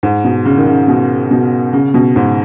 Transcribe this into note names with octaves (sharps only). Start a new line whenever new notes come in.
G#2
B2
C#3
D#3
C#3
B2
B2
C#3
B2
G#2